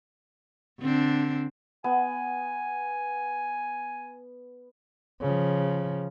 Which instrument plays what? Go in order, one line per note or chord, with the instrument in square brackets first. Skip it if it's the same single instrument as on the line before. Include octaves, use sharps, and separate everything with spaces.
[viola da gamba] D3 C4 D4
[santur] B3 [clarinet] G#5
[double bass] C#3 F3